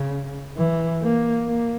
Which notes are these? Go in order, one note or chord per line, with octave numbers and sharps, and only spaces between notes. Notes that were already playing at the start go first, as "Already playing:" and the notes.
Already playing: C#3
E3
A#3
A#3